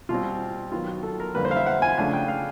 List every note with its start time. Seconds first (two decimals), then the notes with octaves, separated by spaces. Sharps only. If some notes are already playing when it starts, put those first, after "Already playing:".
0.09 B2 G3 C4 F4
0.72 D#3 F#3 B3 F4
0.88 F#4
1.03 A4
1.20 A#4
1.35 F2 D3 G3 A#3 B4
1.45 C5
1.51 F5
1.56 E5
1.66 F#5
1.82 G#5
1.97 C#3 F3 A3 D4 F4 G#5
2.13 G5
2.28 F5